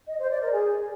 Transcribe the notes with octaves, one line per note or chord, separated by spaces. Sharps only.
D#5
C5
D5
A#4
G#4